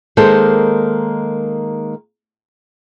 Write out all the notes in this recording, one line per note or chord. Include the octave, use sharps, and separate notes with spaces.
D#3 G#3 A#3 A4 A#4 C5